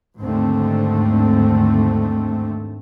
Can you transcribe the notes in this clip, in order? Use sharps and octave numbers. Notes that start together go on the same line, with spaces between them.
D#2 G#2 D3 A3 C4